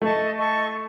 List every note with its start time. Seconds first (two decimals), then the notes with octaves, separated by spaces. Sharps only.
0.01 A3 A4 D#5 A5 C#6
0.37 A4 D#5 A5 C#6